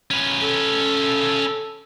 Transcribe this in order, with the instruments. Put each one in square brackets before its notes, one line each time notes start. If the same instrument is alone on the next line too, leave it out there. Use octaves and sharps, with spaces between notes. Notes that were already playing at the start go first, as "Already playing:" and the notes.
[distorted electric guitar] C#4 B4
[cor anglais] A4